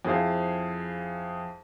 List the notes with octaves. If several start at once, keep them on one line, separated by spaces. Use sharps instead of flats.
F2 E4 G#4 C5 F5